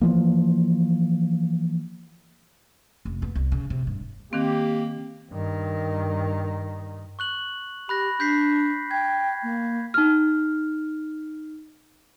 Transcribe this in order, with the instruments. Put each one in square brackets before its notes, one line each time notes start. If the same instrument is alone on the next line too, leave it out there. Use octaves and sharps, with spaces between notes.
[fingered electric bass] E3 F3 A#3
[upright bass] F1
B3
C2
C#3
C3
G2
[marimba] D#3 C4 [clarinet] A#3 [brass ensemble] G4
[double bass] G2 D#3
[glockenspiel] C#6 F#6 F#7
[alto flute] G4 [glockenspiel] B5 F#6 A#6
[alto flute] D4 [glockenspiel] G6 B6 C7
[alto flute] G5 [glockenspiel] G#6
[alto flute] A#3
[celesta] D#4 F6